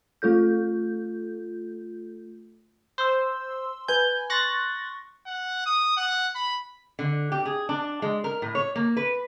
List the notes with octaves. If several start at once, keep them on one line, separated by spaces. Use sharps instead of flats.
A3 F4 A4 G6
C5 C6 E6
B4 G#5 G6
C6 C#6 F#6 A6 A#6
F#5
D#6
F#5
B5
D3
G4
G#4
D4
G#3
A#4
A2
C#5
A#3
B4